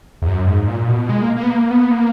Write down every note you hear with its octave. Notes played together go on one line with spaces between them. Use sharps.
E2
F#2
G#2
A#2
B2
G#3
A#3
A#3
B3
A#3
B3
A#3